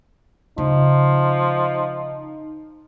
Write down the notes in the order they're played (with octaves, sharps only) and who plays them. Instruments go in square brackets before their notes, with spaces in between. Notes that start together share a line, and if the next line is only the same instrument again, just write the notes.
[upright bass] C#3 [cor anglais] F3 [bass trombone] D#4